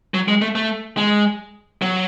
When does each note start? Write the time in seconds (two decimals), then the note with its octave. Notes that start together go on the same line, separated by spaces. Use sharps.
0.14 F#3
0.28 G#3
0.42 A3
0.55 A3
0.97 G#3
1.82 F#3